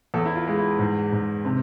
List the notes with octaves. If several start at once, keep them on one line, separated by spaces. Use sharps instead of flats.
E2 A4
E4
F4
G#3
E4
G#2
G#2
C3